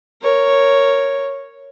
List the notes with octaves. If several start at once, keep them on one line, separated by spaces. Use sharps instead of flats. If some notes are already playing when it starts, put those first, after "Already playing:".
A#4 C#5